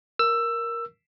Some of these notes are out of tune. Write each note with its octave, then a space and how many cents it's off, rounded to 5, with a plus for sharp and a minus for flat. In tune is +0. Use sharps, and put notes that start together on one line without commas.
A#4 +5 E6 +15